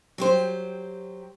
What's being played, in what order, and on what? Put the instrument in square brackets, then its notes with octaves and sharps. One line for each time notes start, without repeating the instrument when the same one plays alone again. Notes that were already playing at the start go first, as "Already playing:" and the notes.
[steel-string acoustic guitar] F#3 G4 C5